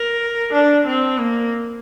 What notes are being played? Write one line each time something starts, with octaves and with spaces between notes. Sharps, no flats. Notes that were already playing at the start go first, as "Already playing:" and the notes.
Already playing: A#4
D4
C4
A#3